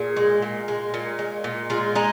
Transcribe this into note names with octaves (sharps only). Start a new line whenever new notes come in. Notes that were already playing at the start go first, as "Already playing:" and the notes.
Already playing: A#2 G#4
G#3
A#2
G#3
A#2
G#3
A#2
G#3 F4
G#3 D#4